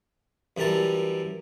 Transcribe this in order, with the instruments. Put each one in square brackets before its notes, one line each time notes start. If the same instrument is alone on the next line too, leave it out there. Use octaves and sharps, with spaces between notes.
[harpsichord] F#2 E3 G3 A#4 A5